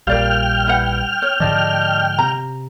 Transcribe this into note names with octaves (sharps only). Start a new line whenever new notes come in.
A#1 G3 A#4 D5 F5 G5 F6
E4 B4 F#5
C#5
G#2 D3 F3 D5 D#5 A5
C3 A#5